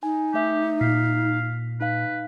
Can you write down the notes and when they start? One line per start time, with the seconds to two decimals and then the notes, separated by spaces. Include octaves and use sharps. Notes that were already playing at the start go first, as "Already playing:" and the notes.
0.03 D#4 G#5
0.34 A3 G4 E5
0.81 A#2 F5 B6
1.81 D#4 B4 F5